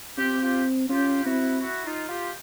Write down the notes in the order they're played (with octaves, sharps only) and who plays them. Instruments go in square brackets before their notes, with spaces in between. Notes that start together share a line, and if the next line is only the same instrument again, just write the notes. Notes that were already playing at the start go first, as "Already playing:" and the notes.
[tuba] C4 [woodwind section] F4 G4
[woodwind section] F4 G4
[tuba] C#4 [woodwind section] F4 G4
[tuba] C4 [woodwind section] E4 F#4
[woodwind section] E4 F#4
D#4 F4
F4 G4